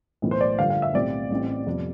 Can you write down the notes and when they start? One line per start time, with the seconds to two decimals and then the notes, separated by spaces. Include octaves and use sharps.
0.22 B1 A2 E3
0.31 C5
0.41 D5
0.58 G2 D3 F3 F5
0.70 F5
0.82 E5
0.94 B1 A2 G3 C4 D5
1.31 A1 A2 G3 C4
1.66 F2 C3 G3 B3